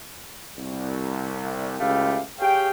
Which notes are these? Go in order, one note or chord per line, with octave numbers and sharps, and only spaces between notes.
C2
C#2 A3 E4 G4 F5
G4 G#4 C#5 F5 G5